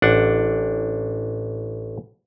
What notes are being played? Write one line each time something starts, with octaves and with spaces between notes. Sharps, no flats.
A1 D4 F#5